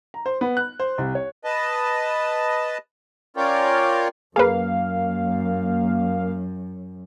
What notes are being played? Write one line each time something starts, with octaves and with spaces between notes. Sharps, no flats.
A#5
C5
B3
F#6
C5
C2
C#5
B4 D#5 A5
C#4 F4 A#4 C#5 D5 G5
F#2 A#3 G#4 B4 F5